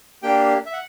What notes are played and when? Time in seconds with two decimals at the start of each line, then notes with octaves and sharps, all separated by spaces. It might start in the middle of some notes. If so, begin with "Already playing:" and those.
0.23 A#3 D4 G4 G5
0.66 E5
0.73 F#5